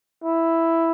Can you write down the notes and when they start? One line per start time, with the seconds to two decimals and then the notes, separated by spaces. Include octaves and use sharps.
0.24 E4